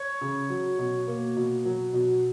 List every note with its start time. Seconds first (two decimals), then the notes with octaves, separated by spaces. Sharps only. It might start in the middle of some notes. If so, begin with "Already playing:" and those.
Already playing: C#5
0.21 C#3
0.50 F#3
0.79 B2
1.07 A#3
1.36 B2
1.65 F#3
1.93 B2